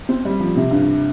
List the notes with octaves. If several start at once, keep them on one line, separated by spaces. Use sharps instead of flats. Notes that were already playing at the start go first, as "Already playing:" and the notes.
C4
G3
F3
C3
G2